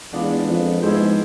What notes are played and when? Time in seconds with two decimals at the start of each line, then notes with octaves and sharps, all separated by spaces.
0.12 E2 G#3 B3 D4 F4
0.47 F2
0.82 G#2 F3 B3 E4 G#4 C5